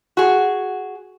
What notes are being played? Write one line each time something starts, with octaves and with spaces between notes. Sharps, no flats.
F#4 G#4